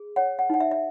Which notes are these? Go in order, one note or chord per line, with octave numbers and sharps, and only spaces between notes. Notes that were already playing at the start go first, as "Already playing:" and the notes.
Already playing: G#4
C#5 F#5
F#5
D#4 F#5
E5
E5